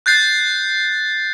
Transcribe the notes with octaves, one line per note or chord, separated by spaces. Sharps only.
F#6 G6 A6 C7